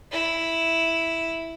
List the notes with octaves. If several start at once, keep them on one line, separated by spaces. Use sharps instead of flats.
E4